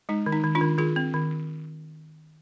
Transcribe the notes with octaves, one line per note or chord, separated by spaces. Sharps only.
G#3 D#4
D#3
D#4
D#3
D4 F4
D#3
D#3 F4 G#4
C4
D#3